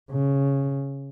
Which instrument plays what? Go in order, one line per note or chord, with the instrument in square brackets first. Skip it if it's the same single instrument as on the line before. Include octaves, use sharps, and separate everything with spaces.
[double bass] C#3